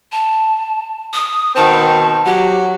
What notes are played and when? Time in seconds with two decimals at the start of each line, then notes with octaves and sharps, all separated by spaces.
0.12 A5
1.13 D#6
1.56 B2 D#3 C4 A5
2.25 F#3 G4